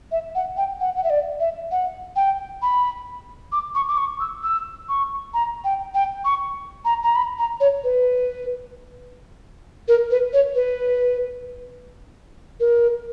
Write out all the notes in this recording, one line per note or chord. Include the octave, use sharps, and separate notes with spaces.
E5
F#5
G5
F#5
F#5
E5
D5
E5
F#5
G5
B5
D6
C#6
D6
C#6
E6
E6
C#6
A#5
G5
G5
C#6
A#5
A#5
B5
A#5
C#5
B4
A#4
B4
C#5
B4
A#4